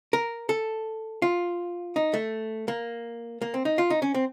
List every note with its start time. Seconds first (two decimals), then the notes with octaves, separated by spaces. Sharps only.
0.13 A#4
0.49 A4
1.22 F4
1.96 D#4
2.14 A3
2.68 A#3
3.42 A#3
3.54 C4
3.65 D#4
3.78 F4
3.90 D#4
4.02 C#4
4.14 C4